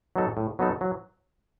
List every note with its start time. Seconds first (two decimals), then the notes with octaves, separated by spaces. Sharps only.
0.16 F#3 B3 D#4 A4
0.37 A2
0.59 F#3 B3 D#4 A4
0.81 F#3